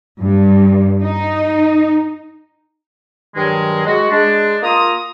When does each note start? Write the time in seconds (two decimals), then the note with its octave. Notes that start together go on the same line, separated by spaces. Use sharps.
0.21 G2
1.02 D#4
3.35 G2 D#3 F#3 G#3
3.85 G#3 F#4
4.10 G#3 D4
4.62 A#3 F4 A#5 D#6